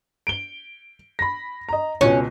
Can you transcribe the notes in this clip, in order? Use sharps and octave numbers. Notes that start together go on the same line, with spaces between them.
D7 G7
B5 A#6
D#5 A#5
C#2 B2 C#4